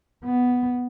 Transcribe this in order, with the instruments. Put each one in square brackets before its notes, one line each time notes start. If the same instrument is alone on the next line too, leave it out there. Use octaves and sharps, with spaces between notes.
[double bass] B3